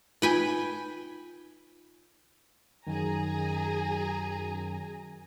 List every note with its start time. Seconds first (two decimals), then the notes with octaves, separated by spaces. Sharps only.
0.22 D#4 F4 B4 G5 G#5
2.87 F#2 D#3 G#4 G#5 A#5